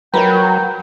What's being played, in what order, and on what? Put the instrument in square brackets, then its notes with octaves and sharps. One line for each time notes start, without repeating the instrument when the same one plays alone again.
[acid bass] F#3 [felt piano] A#4 A#5 [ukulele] B4 C#5 [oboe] G5